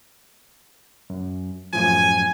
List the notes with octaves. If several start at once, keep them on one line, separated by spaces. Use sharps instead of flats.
F#2
F#2 A2 F3 G#5